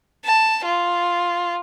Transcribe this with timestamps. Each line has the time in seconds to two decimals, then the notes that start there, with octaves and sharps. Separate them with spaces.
0.25 A5
0.65 F4